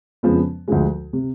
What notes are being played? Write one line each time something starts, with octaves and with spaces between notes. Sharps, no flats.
F2 C#3 F3 G#3 B3
D2 D3 F3 G#3
C3